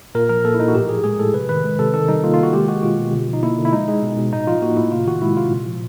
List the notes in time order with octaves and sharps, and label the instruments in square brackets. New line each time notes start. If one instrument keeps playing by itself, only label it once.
[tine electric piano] A#2 A#4
F3 A#4
A#3 A4
E4
A#2 D#4
F#4
A2 G4
F3 G#4
G#3 G#4
A2 A4
C3 B4
D#3 B4
G#3
C3 A4
D#3 A4
G3 D#4
A#3 F4
F4
D#3 F#4
G#3 G4
G#3 F#4
B2 F4
B2
D3
F3
D#4
A#3 E4
D3
E4
G#3 D#4
G#3
B2
B2
A2 D#4
F3 F4
A#3 F#4
A2 E4
C3 F4
D#3 F#4
G#3 E4
C3 F4
A#2
F3